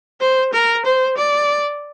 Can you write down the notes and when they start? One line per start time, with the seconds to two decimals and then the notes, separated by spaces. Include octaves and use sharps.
0.21 C5
0.53 A#4
0.85 C5
1.17 D5